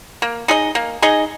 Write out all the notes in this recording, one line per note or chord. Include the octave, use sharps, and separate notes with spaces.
A#3
D#4 G#4 D#5
A#3
D#4 G#4 D#5